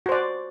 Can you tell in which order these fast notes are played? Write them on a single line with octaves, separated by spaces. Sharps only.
F#4 C5 D5